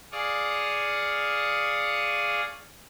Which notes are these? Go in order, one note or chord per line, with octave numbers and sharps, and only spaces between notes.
G#4 D5 F5 C#6 D#6